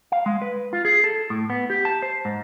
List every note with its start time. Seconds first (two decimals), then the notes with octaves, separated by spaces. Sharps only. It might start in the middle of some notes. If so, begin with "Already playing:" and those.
0.12 F5
0.26 G#3
0.42 B4
0.73 F4
0.85 G#4
1.04 A4
1.30 A2
1.50 B3
1.70 G4
1.85 A5
2.02 C5
2.25 G#2